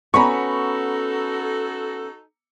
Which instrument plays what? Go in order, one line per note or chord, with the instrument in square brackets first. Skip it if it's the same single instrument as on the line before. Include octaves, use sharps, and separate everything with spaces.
[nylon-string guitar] B3 C#4 [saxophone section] D#4 F#4 A4 [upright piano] A#5 B5 C#6